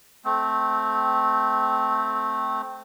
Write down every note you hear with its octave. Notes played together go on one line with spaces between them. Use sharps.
A3 C4